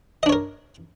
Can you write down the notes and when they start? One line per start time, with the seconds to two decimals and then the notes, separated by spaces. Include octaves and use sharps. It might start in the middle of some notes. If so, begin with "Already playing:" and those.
0.23 D#5
0.26 D4
0.29 C#5
0.33 A#4